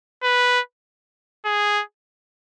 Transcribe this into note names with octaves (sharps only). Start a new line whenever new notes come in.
B4
G#4